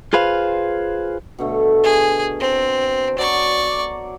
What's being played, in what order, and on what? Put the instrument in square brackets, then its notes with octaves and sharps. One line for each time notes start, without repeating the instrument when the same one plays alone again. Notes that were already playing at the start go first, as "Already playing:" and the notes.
[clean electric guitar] F4 G#4 B4 C5 F5
[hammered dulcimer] B2 D3 A3
[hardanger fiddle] G#4 [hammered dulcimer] G#5
[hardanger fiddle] C4
[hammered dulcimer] F#3 [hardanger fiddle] D5 C#6
[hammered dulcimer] D6